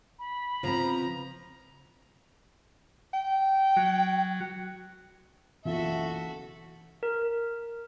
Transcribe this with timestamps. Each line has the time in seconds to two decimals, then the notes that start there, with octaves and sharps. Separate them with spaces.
0.19 B5
0.63 C#3 F3 B3 C4 A#5
3.13 G5
3.77 F#3
5.65 F#1 B1 E3 F4 F#4 A4 E5
7.03 A#4